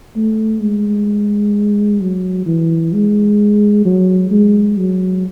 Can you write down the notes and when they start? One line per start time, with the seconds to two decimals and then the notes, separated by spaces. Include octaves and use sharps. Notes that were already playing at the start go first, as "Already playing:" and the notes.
0.16 A3
0.62 G#3
2.01 F#3
2.46 E3
2.93 G#3
3.85 F#3
4.31 G#3
4.77 F#3